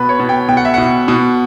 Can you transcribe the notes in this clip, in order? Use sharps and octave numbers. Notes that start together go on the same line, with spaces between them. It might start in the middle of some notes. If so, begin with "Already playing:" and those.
Already playing: B2 B4
C#5
B2
G5
B2 G5
F#5
E5
B2 F#5
B2